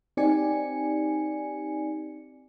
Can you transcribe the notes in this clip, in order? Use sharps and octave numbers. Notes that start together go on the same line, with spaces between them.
C4 D#4 G4 D5 G#5 C#7